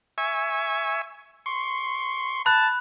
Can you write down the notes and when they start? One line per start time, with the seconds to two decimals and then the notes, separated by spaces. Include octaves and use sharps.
0.18 E5 G#5 C#6
1.46 C6 C#6
2.46 A5 B5 F#6